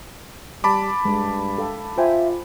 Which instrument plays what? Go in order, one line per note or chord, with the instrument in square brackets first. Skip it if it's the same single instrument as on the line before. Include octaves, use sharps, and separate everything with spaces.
[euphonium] G3 [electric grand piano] A5 B5 D6
[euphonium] G2 [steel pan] G#3
[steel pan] A4 F5 G5
[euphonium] F4 [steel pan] C5 G5 G#5 [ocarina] E5